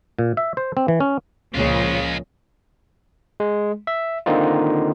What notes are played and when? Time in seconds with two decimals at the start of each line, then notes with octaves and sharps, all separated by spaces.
0.19 A#2
0.37 E5
0.57 C5
0.77 C4
0.88 E3
1.00 C#4
1.54 C#2 A#2 C#3 F3 G#3 F4
3.40 G#3
3.87 E5
4.26 D3 D#3 A#3 C4 D#4 F4